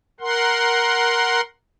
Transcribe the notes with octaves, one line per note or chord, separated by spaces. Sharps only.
A#4 F#5 C6